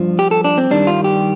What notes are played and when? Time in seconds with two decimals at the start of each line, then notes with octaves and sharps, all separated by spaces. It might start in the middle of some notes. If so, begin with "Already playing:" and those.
Already playing: G2 F3
0.19 G4
0.31 A4
0.44 D4
0.58 C4
0.71 G2 D#3 G3 D4
0.87 F4
1.04 G4